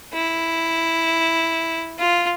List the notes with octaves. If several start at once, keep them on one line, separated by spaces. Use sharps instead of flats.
E4
F4